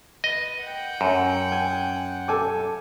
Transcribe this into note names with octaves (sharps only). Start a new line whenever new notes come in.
B4 D#5
F#5 G5
F#2
G#5
A4 G#5 D6